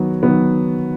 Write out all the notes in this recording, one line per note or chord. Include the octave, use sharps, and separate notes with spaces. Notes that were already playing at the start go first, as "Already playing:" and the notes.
Already playing: D#3 F#3 B3
D#3 F#3 B3